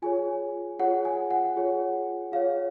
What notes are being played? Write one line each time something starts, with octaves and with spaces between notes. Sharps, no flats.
F4 G#4 C#5 G#5
F4 G#4 C#5 F#5
G#5
F#5
F4 G#4 C#5
F4 G#4 C#5 F5